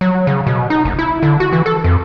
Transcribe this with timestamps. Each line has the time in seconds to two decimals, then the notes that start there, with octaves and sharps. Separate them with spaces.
0.01 F#3
0.27 C#3
0.47 B2
0.70 D#4
0.85 F#1
0.99 E4
1.23 D3
1.40 F#4
1.53 E3
1.66 A4
1.84 F2